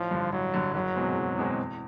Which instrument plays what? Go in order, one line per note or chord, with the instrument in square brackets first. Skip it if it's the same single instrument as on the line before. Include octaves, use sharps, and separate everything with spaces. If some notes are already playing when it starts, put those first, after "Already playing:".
Already playing: [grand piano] A1 [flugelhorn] F3
[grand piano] G2 D3
[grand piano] A1 [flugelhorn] F#3
[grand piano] G2 D3
[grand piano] F#1 [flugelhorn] F#3
[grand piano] E2 B2 G#3 C4
F#1
E2 B2 G#3 C4
E2